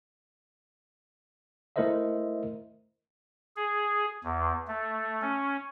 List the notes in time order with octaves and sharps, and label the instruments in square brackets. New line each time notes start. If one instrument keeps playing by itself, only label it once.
[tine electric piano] A3 E4 A#4 C5 D#5 E5
[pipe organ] G#4
E2
A3
C#4